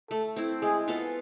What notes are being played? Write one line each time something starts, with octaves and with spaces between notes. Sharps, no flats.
A3 A4
C4 E4
G#3 G#4
B3 F4 A4